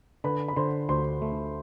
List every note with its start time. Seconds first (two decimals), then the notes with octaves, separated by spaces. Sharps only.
0.24 D3 B4 B5
0.48 B5
0.56 D3 C5 C6
0.89 D2 C5 C6
1.22 A3